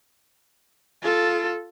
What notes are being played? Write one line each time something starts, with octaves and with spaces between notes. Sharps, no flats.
F4 A4